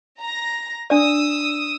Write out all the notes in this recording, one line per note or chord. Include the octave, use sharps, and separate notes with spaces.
A#5 A#6
D4 D5 D#6 E6